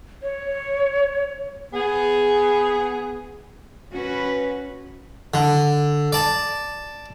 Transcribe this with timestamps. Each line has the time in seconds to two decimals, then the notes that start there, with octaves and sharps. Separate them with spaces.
0.22 C#5
1.73 B3 G#4
3.92 C#4 F#4 B4
5.34 D3
6.13 D5 A5